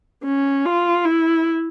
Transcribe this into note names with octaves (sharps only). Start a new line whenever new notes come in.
C#4
F4
E4